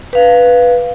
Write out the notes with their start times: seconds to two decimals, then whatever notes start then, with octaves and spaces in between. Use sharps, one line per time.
0.13 B4 F5